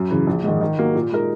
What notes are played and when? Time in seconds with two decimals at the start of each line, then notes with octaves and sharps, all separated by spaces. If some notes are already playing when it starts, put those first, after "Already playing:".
Already playing: F#2
0.11 C#3 E3
0.27 A#1
0.44 G#2 D#3 G#3
0.61 D#3
0.78 F#3 A#3
0.95 A#2
1.12 G#3 D#4 A#4